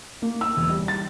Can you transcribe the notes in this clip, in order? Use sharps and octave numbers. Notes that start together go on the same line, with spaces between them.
A#3
E6
E1
G3
A6